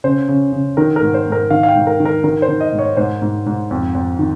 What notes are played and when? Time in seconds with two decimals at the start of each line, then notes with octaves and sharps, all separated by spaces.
0.04 C#3 C5
0.28 C#3
0.52 C#3
0.77 D#3 A#4
0.96 A#4
1.02 G#2
1.14 C5
1.27 G#2
1.32 A#4
1.50 D#3 F5
1.63 F5
1.68 G5
1.75 G#2
1.87 A#4
2.00 D#3
2.05 A#4
2.24 D#3 A#4
2.42 C5
2.49 D#3
2.61 D#5
2.72 G#2
2.79 C#5
2.97 G#2 C5
3.22 G#2
3.46 G#2
3.71 F2
3.95 F2
4.19 D#3